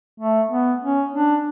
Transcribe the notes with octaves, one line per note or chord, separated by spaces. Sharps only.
A3
B3
C#4
D4